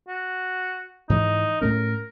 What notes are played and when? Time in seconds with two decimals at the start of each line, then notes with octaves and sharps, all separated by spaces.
0.08 F#4
1.10 G#2 E3 D#4
1.61 A2 A3 C#4 A#4